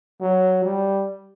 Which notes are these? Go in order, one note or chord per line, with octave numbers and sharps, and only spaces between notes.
F#3
G3